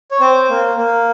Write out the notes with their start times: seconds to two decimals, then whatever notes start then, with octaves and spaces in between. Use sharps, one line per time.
0.11 C#5
0.20 C4 C5
0.50 A#3
0.77 A#3